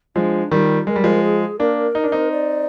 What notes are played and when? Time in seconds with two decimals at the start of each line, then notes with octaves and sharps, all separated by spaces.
0.15 F3 G#3 D4 D#4
0.51 D#3 G3 F4
0.87 G#3 A#4
0.96 G3
1.04 F3 G#3
1.23 G#4
1.59 A#3 D4 A#4
1.95 D#4
2.04 D4
2.12 C4 D#4
2.31 D5